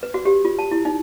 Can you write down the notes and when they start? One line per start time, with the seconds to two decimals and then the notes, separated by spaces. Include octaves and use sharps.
0.03 B4
0.14 F#4
0.25 G4
0.45 F4
0.59 A5
0.71 E4
0.85 D#4